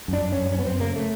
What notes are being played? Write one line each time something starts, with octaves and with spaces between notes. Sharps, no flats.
F#2
D4
F#2
C#4
F#2
F#2 C#4
B3
F#2 C4
C#3 A#3
A3